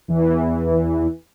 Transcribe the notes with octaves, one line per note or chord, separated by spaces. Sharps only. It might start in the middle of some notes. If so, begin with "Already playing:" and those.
E2 E3